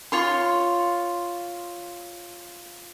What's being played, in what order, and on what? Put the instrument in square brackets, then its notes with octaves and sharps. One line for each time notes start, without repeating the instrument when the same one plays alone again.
[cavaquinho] F4 C#5 C6